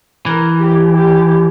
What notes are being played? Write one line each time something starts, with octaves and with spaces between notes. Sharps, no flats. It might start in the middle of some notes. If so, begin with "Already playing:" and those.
E3 A#4
G4
G4